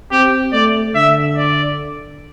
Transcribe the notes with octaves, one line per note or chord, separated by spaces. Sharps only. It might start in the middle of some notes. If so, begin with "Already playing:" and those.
C4 G4
A3 D5
D3 E5
D5